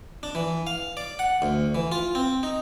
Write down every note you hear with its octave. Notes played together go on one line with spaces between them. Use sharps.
D4
E3
F5
D5
F#5
D2
E3
F4
C4
D#4